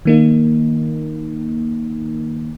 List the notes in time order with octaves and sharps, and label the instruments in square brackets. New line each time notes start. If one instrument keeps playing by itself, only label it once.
[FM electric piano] D#3 A#3 D#4